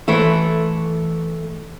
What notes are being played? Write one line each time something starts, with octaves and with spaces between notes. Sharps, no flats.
E3 A3 E4